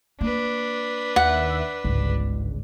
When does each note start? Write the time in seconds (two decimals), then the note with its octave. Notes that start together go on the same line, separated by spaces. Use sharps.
0.21 A#3 D4 B4
1.16 D#2 E5 F#5
1.84 G1 C#2 G#2